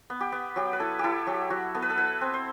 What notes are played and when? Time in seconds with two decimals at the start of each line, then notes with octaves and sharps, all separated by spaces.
0.10 B3
0.20 G4
0.32 B3
0.56 F#3 G4
0.73 B4
0.79 E4 A4
0.99 E4 G4 A4
1.27 F#3 G4
1.50 F#3 F#4
1.75 B3 A4
1.82 B4
1.90 A4
1.97 E4 B4
2.21 C4
2.33 C5